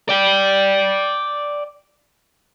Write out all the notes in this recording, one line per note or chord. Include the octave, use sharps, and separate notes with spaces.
D5 G5